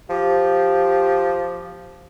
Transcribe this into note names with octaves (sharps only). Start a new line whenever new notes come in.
F3 G4